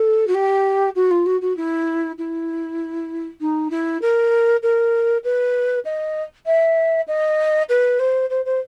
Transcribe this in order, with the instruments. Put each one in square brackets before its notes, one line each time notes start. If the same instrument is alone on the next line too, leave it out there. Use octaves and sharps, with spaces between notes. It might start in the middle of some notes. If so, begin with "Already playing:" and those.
Already playing: [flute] A4
F#4
G4
F#4
F4
F#4
F#4
E4
E4
D#4
E4
A#4
A#4
B4
D#5
E5
D#5
B4
C5
C5
C5